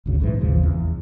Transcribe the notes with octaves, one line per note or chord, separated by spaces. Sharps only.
G#1 D2 C#3
A#1 G#2 E3
G#1 D#2 C#3 F3
E2